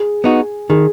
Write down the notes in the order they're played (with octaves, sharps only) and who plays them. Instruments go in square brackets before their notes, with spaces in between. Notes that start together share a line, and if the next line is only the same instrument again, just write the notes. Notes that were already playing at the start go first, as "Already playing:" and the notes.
Already playing: [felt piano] G#4
[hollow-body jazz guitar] B3 D#4 F#4
[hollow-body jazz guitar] D#3 [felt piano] G#4